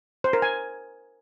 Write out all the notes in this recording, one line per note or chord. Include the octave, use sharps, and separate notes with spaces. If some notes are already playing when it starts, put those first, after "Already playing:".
C5
A#4
G#5